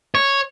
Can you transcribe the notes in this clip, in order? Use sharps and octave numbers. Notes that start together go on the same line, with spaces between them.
C#5